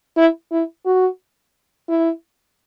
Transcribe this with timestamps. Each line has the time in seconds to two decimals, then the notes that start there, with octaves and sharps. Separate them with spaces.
0.17 E4
0.52 E4
0.86 F#4
1.89 E4